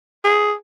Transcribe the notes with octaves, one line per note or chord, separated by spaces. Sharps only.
G#4